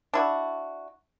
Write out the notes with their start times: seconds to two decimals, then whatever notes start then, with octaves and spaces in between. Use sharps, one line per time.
0.14 D4 E4 F#4